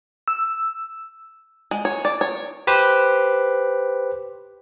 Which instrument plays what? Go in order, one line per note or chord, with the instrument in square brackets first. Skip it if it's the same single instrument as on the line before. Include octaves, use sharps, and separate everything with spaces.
[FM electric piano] E6
[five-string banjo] G#3
C#5
D5
C#5
[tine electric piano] G4 B4 C5